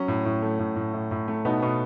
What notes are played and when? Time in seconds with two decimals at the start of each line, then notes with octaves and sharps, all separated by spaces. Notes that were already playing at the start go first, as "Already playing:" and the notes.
Already playing: F#3 C#4
0.08 A2
0.25 A2
0.42 A3
0.59 A2
0.76 A2
0.93 A2
1.11 A2
1.28 A3
1.45 B2 B3 D#4
1.62 B2 B3